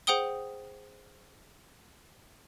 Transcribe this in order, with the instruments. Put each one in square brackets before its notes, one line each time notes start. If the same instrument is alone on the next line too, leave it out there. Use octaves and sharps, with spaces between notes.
[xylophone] G#4 C5 F#5 G5 D#6 G7